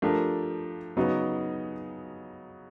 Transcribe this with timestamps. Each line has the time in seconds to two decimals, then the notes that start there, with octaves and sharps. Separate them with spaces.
0.02 F3 A3 D4 G4 A#4
0.97 C#3 F#3 B3 D#4